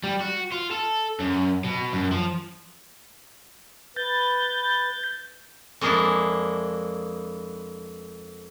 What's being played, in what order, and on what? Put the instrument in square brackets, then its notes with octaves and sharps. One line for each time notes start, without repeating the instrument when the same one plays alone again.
[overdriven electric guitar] G3
F#4
F4
A4
F#2
B2
F#2
F3
[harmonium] B4 [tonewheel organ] G6 A6
[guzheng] F2 G#3 A#3 D4 E4